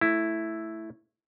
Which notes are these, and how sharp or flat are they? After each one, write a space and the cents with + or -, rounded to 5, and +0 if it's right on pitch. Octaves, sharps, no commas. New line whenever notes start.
A3 +0 E4 +0